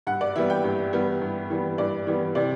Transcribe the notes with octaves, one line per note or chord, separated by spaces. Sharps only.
G2 F#5
D5
E3 G3 B3 E5
G5
G2
E3 G3 B3
G2
E3 G3 B3
G2 D5
E3 G3 B3
C3 D5